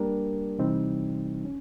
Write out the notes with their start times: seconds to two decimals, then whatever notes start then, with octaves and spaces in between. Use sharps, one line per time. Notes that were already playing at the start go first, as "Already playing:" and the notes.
Already playing: G3 A#3 D4 G4 A#4
0.59 C3 E3 G3 C4 D#4
1.45 C#4